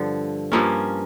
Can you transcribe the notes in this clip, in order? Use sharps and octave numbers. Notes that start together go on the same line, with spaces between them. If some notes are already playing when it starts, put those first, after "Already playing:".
Already playing: G2 D3 F3
G2 F3 A#3 C#4